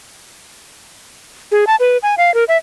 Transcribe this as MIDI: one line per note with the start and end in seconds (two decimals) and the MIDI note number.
1.52 1.65 68
1.67 1.76 81
1.80 1.98 71
2.03 2.15 80
2.18 2.33 77
2.34 2.44 70
2.48 2.57 76